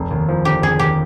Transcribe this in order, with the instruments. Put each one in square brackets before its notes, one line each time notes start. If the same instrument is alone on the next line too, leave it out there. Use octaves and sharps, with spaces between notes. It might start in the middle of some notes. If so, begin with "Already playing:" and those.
Already playing: [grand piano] F1
D#2
F3
[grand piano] D3 [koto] G4
[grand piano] F1 [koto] G#4
[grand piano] D#2 [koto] G4